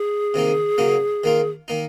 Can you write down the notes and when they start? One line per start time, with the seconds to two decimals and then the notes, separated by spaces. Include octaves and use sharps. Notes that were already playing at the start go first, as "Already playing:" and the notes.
Already playing: G#4
0.34 C3 D#3 A#3 D#4
0.78 C#3 F#3 A#3 C#4
1.24 D#3 A#3 F4
1.68 D#3 A#3 D#4